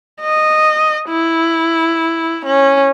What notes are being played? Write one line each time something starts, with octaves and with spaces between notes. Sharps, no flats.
D#5
E4
C#4